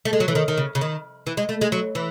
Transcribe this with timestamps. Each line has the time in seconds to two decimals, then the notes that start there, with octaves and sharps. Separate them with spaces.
0.05 A3
0.13 G#3
0.20 F#3
0.28 E3
0.35 D#3
0.48 D#3
0.57 C#3
0.75 C#3
0.81 D#3
1.27 E3
1.37 G#3
1.49 A3
1.61 G#3
1.72 F#3
1.95 E3